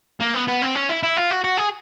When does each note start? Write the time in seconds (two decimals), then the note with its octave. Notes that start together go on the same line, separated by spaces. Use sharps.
0.21 A#3
0.35 B3
0.48 B3
0.62 C4
0.75 C#4
0.89 E4
1.03 E4
1.17 F4
1.31 F#4
1.44 F#4
1.57 G#4